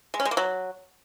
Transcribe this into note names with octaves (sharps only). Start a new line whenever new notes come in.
G#3
C#4
G#3
A#3
F#3